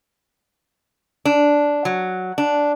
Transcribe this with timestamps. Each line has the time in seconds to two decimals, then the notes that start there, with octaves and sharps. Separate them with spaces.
1.25 D4
1.85 F#3
2.38 D4